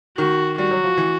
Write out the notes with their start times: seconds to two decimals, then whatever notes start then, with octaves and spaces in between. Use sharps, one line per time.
0.17 D#3 F#4
0.58 G3 F#4
0.71 F#3
0.84 F3
0.97 E3